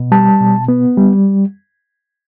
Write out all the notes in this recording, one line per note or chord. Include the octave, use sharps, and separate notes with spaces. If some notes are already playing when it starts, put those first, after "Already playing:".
Already playing: B2
G3 A5
B2
B3
G3